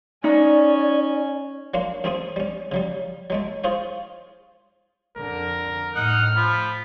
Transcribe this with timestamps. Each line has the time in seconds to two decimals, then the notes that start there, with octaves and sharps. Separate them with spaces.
0.24 C#4 D#4 D5 G#5
1.74 F#3 A#3 D4 F5 C6
2.04 F#2 A3 C4 G#4 C6 D#6
2.36 G3 C#4
2.72 C#3 F#3 G3
3.30 F#3 G#3 A3
3.64 F4 G#4 C5 C#5 F5
5.17 F2 D3 A#4
5.95 A2 D#4 F#5 F6
6.36 F3 B5